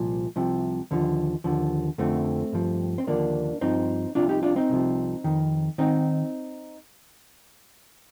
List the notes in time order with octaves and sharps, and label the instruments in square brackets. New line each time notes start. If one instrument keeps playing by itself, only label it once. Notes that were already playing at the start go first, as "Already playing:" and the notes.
Already playing: [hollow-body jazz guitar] C2 A#2 F3
C2 C3 F3
D#2 D3 F3
D#2 D3 F3
F2 D3 F3 A3 C4
G2 F3
C4
D#2 D3 F3 A#3 D4
G2 F3 C4 D#4
C2 C3 F3 D4 F4
D#4 G4
D4 F4
C4 D#4
C2 C3 F3
F2 D#3
D#3 C4 D#4